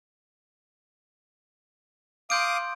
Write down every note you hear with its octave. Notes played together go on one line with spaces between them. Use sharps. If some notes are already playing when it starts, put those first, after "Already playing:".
F5 C6 D6 D#6 G6 D7